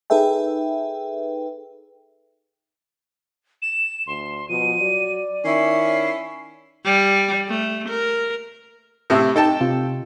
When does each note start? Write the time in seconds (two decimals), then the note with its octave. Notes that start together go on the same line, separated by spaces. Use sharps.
0.10 D#4 G#4 A4 B4 E5 G5
3.62 E7
4.07 D2 C6
4.49 B2 F3 D#7
4.81 F#3 D5
5.45 D#3 C#4 E4 C7
6.85 G3
7.48 A3
7.89 A#4
9.10 A2 C3 E4
9.36 D#4 A4 G5 A5
9.61 C3 F4